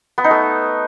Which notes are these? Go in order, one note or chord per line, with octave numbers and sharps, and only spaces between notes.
B3
D#4
A3